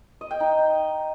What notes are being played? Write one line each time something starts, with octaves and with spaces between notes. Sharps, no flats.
D#5
G5
D#4